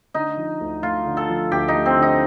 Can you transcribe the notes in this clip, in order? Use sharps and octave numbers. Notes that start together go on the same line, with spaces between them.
D3 D#4
F3
D2
A3 F4
D3
A4
F3
D2 G4
D#4
A3
C4
D3
D#4